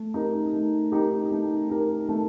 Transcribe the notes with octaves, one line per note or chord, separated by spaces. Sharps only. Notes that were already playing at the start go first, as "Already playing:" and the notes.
Already playing: A3
D#4 G4 A#4
A3
D#4 G4 A#4
A3
D#4 G4 A#4
A3